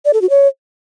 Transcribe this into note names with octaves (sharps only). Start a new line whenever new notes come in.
D5
A4
F#4
C#5